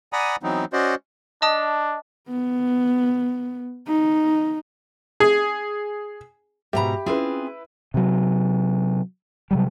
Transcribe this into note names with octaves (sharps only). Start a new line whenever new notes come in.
D5 F#5 G#5 A#5 B5 D#6
E3 F#3 B3 C4 D#4
C#4 F#4 C5 D5 D#5
D4 D#5 A5 D#6
B3
D#4
G#4
G#2 B2 F#4 G4 E5 A#5 B5
C4 C#4 E4 F4 G#4 B4
C3 F#3
C3 F#3 G3